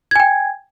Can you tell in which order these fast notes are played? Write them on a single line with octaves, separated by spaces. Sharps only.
G#6 G#5 G5